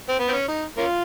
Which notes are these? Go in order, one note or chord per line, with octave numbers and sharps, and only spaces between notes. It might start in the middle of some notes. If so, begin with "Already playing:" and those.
C4
B3
C4
C#4
D#4
A#3 C#4 F4